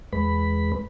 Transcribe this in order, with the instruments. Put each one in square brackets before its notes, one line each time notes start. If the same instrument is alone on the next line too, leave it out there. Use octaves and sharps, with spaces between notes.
[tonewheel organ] E2 G#3 B4 B5